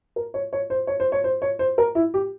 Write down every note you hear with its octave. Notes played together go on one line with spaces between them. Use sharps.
A#4
C#5
C#5
C5
C#5
C5
C#5
C5
C#5
C5
A#4
E4
G4